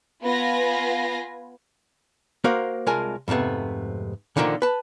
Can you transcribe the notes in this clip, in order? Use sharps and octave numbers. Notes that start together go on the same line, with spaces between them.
B3 F4 B4 G#5 A#6
A#3 F#4 A#4 C5
C2 G#3 F4 A#4 G#5 A5
F2 G#2 C3 A3 B3
A#2 D3 D#3 F3 A3 A#3
B4 A5